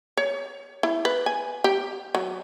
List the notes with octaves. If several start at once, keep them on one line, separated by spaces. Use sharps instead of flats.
C#5
E4
B4
G#5
G4
F#3